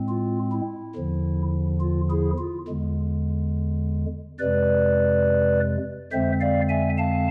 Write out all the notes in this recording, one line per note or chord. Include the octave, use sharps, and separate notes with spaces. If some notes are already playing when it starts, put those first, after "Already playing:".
Already playing: A2 G#3 C4
F4
E4
E2 D3 F3
F4
E4 G#4
F4
E2 D3 G#3
F2 C3 G#3 B4 D5
F2 D3 G#3 C4 C5 E5
D5 F5
E5 G#5
F5 A5